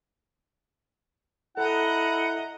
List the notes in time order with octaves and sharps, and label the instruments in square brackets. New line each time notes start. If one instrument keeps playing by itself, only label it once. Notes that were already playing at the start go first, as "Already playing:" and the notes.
[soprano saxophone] E4 [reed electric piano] A4 [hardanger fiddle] D#5 A#5 [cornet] F#5